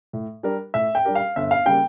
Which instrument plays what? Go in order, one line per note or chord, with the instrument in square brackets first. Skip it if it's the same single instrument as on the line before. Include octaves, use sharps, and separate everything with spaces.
[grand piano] A2
G3 D4 G4 A#4
[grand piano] A2 [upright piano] E5
[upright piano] G5
[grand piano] G3 D4 G4 A#4
[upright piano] F5
[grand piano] G1 [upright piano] E5
[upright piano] F5
[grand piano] C#3 G3 A#3 [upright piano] G5